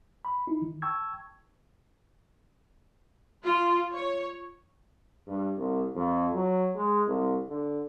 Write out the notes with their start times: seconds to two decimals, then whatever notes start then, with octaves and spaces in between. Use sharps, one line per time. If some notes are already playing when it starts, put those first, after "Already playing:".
0.25 B5
0.47 D#4 E4
0.62 D#3
0.82 G5 A5 C#6 E6 G#6
3.45 F4
3.93 C#5
5.27 G2
5.57 C2
5.95 F2
6.34 F#3
6.75 G#3
7.07 C2
7.49 D3